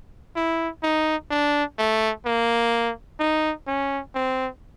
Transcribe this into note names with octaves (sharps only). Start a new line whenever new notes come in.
E4
D#4
D4
A3
A#3
D#4
C#4
C4